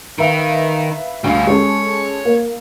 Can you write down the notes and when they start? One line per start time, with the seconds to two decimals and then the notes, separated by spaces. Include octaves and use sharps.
0.18 D#3 B4 E5 F5
1.24 D2 G3 F5 C7
1.47 G#3 C#4 A4 C#5
2.25 A#3